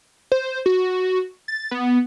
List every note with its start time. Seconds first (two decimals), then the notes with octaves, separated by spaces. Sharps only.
0.32 C5
0.66 F#4
1.48 A6
1.71 B3